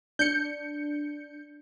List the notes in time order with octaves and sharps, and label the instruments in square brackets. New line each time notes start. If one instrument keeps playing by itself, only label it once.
[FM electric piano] D4 [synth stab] G6 C#7